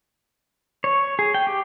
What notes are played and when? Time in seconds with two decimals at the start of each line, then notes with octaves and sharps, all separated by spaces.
0.84 C#5
1.19 G#4
1.34 G5
1.47 G4